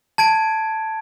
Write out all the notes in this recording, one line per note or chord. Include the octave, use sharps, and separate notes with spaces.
A5 G#6 D7